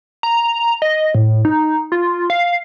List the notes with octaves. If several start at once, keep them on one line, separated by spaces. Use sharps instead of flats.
A#5
D#5
A2
D#4
F4
F5